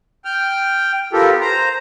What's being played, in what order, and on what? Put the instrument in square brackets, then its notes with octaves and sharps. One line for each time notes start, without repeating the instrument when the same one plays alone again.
[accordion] G5 F6
B3 F4 G4 A4 A#4
C5 A#5